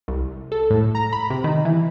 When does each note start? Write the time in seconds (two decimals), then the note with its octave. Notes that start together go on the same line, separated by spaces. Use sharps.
0.08 C2
0.52 A4
0.70 A2
0.95 A#5
1.13 B5
1.30 C3
1.44 D#3
1.65 E3